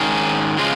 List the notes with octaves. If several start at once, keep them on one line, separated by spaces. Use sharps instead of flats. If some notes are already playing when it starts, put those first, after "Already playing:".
Already playing: G#2 D#3 C#4 G#4
C#3 F3 G#3 F4 G#4